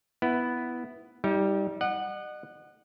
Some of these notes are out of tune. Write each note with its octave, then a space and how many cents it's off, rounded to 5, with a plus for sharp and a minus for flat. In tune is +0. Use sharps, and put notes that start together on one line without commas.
B3 +0 E4 +0
G3 +0 D#4 +45
D#5 -40 F#5 +0